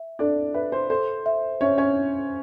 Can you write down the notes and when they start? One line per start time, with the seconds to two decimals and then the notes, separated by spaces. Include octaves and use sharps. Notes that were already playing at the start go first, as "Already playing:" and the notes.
Already playing: E5
0.19 D4 A4 D5
0.54 B4 E5
0.72 C5
0.90 A4 C5
1.26 E5
1.61 C#4 C#5 E5
1.78 C#4 C#5